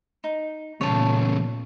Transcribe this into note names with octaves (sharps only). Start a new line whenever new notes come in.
D#4
E2 A#2 C#3 C#5 A5